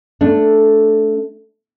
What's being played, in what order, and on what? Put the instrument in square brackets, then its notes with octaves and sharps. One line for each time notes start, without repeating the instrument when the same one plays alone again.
[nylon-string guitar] A3 D4